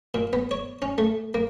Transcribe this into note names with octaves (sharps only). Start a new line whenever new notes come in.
A#2
B3
C#5
C#4
A3
A#3